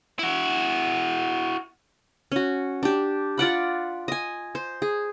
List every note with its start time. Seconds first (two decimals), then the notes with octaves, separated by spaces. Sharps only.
0.19 E4 F#4
2.32 C#4 F#4
2.83 D4 G4
3.38 F4 D5 F#5 B5
4.08 D#5 G#5
4.55 C5
4.82 G#4